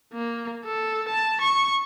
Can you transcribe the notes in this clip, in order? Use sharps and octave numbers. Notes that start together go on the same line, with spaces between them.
A#3
A4
A5
C#6